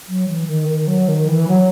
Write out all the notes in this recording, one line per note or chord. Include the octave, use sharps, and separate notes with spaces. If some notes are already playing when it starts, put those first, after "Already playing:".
F#3
E3
D#3
D#3
F#3
D#3
E3
F#3